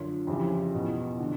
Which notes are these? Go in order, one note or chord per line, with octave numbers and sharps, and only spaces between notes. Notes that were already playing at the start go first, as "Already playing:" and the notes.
Already playing: F#2 D3 F4
F2 C#3 E3 F4 G4
E2 B2
D3